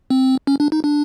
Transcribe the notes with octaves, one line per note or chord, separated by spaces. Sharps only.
C4
C#4
D4
D#4
D4